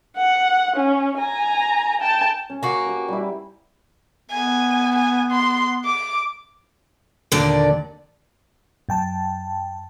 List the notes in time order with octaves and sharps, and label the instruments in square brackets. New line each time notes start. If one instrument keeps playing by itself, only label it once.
[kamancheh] F#5
C#4
G#5 A#5
G5 A5
[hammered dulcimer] C#4
[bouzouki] A#3 F#4
[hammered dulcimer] G4 B4
G3 E4
[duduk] B3 [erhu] G#5
[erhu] G#5
C6
D6
[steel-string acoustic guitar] D#2 A#2 D3 D5
[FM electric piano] F#2 G5 A5